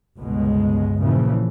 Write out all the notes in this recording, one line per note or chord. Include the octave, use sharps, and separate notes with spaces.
G1 C#2 B2 G#3
A#2 C#3 E3 F3